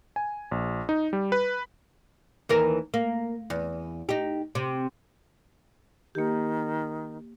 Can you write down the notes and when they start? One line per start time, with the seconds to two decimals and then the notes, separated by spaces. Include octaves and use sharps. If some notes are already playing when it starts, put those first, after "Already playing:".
0.16 G#5
0.51 A#1
0.89 D#4
1.13 G3
1.32 B4
2.49 D#2 E3 A#4
2.94 A#3
3.50 E2
4.09 D#4 G4
4.55 C3
6.15 D#3 A#3 G4